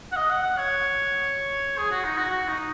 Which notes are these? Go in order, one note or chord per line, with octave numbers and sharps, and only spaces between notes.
F#5
D#5
F#5
F#5
C#5
G#4
F#4
D#4
F#4
F#4
D#4